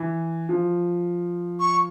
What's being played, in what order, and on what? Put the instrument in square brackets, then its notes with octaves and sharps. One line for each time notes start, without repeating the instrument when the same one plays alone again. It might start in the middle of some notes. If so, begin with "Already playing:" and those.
Already playing: [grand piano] E3
F3
[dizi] C#6